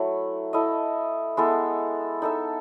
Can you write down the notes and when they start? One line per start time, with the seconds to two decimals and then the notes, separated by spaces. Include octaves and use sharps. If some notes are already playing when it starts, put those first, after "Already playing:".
Already playing: F#3 A3 E4
0.53 E4 A4 D#5
1.37 G#3 B3 E4 A4
2.22 D#4 A4 E5